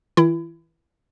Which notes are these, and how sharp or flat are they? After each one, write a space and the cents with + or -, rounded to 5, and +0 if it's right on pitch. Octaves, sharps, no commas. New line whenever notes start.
E3 -35 E4 +30